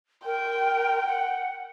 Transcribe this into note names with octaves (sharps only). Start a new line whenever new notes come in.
A#4 G5
F#5